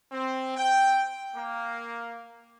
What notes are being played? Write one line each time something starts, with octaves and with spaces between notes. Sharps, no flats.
C4
G5
A#3